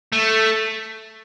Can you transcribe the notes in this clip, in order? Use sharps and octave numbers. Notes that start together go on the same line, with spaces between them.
A3